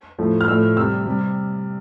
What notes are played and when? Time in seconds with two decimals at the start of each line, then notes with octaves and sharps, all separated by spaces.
0.18 A2 F3 A3
0.41 F6
0.48 A2 F3 A3 E6
0.77 C3 G3 E6
1.05 C3 G3